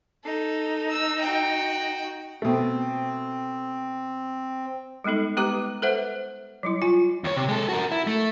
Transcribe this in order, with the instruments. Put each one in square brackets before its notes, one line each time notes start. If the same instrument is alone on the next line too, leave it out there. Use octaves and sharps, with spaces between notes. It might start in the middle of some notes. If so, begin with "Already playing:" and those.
[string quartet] D#4 [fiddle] A4
[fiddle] E6
F#4 G5
[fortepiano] B2 A3 [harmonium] C4
[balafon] G3 G#3 B3 D#4 A4
G#3 B3 G4 B4 A#5 D6
A4 B4 C5 E5 F#5
F#3 G3 E4
F4 G#5
[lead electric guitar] D#2 C#5
C3
G#3 A4
F#4 A#4
E4
A3